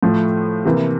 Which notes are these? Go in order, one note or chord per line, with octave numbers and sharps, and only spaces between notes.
A2 F3 A3
C3 E3 A#3